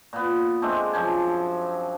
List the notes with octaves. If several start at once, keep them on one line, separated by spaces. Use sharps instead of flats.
A#2 B3
G#3 A3 C4 D4
F#2 F3 C5 G#5